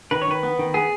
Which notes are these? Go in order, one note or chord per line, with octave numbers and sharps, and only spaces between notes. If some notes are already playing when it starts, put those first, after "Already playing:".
D#3 B4
C#5
D#3 B4
B3
D#3
B3 G#4